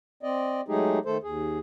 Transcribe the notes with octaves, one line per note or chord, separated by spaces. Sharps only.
C4 D5 D#5
F#3 G#3 A3 D#4 G4 G#4
D#3 A3 A4 C5
D#2 G#4